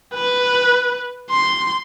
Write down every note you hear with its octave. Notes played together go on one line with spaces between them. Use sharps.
B4
C6